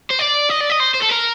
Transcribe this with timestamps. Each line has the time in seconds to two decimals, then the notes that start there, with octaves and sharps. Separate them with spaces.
0.11 C5
0.19 D5
0.50 D#5
0.60 D5
0.70 D#5
0.80 C5
0.95 C5
1.03 A4
1.11 A#4